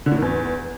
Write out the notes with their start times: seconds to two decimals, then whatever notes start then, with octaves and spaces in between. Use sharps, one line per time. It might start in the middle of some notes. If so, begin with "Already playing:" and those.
0.06 D3
0.11 A2
0.17 D#3
0.22 E2